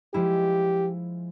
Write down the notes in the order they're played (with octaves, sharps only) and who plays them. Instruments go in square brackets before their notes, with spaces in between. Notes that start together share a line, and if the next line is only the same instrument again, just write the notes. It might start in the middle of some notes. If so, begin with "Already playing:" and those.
[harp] F3 G#3 E4 [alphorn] G4